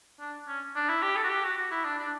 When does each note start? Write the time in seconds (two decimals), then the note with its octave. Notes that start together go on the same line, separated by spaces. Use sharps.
0.20 D4
0.48 C#4
0.76 D4
0.89 E4
1.02 G4
1.16 A4
1.24 F#4
1.29 G4
1.44 F#4
1.58 F#4
1.71 E4
1.84 D4
1.98 D4